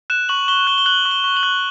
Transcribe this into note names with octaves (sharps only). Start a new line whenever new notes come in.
F#6 E7
C#6 F#7
C#6 G7
F#6 G7
G7
F#6 F#7
C#6
G7
C#6
F#7
F#6